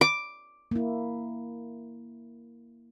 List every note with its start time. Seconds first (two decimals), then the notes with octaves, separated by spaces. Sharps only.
0.01 D6
0.71 A#3 E4